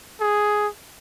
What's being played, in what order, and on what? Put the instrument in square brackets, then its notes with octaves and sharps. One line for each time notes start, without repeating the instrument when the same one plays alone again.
[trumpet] G#4